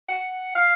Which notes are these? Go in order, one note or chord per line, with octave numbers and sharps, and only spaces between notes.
F#5
F5